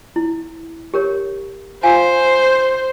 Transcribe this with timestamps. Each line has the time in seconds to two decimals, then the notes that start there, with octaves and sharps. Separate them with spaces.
0.16 E4
0.94 G4 A#4 C#5
1.83 F4 C5 F5 G#5